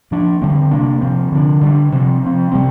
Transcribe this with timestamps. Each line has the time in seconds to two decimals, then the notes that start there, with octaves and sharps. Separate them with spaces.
0.11 F3 A#3 D4
0.42 D3 G3 C4
0.71 C3 A#3 D4
1.01 C3 F3 C4
1.32 D3 F3 D4
1.61 D3 G3 A#3 D4
1.92 C3 F3 C4
2.22 F3 C4
2.52 C3 G3 C4